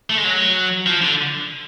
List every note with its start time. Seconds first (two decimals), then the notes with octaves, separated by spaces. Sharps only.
0.10 A3
0.18 G#3
0.24 F#3
0.86 F3
1.02 D3